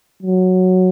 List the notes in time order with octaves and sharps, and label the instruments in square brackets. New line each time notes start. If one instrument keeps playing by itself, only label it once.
[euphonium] F#3